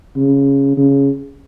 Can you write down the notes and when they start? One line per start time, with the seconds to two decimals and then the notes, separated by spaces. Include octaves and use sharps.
0.16 C#3
0.77 C#3